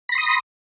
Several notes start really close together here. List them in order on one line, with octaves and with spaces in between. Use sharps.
B5 A#6 C6 D#6